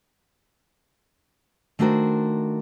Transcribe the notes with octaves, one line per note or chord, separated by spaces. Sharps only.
D#3 A3 D4 F#4 A#4 C5